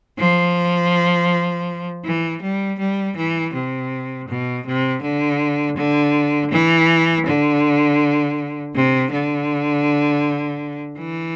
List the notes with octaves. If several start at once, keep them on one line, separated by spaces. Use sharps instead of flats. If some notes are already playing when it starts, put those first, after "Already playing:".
F3
E3
G3
G3
E3
C3
B2
C3
D3
D3
E3
D3
C3
D3
E3